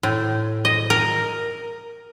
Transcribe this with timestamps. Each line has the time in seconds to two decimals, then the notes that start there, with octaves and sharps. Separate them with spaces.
0.03 A2
0.65 D#5
0.90 A#4